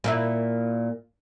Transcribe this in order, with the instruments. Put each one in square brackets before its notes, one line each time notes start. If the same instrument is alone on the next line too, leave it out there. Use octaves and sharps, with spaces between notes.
[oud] A#2 A#3 E4